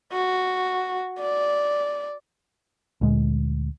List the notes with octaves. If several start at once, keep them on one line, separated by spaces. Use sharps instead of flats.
F#4
D5
D2 A#2 G#3